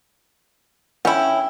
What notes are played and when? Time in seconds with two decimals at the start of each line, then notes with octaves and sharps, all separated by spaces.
1.05 C#4 E4 G5